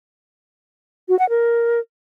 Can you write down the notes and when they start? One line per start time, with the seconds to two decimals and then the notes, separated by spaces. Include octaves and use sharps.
1.09 F#4
1.19 F#5
1.29 A#4